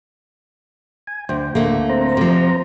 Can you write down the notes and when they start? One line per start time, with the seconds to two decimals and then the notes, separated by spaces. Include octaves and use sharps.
1.07 G#5
1.29 D2 C5 G5
1.55 D2 A2 A3 A#3
1.89 C4 C5 A#5
2.17 C3 F3